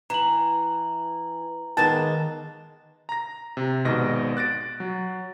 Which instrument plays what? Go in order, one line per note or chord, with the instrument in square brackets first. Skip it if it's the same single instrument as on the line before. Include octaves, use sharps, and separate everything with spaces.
[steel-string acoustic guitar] E3 [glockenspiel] A#5 F#7
[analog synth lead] D#3 [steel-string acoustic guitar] G#3 A#3 B3 [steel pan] A5
[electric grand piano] A#5 A#6
C3
G#1 G#2 B2 D#5 A#6
F#6 A6 A#6 D7
F#3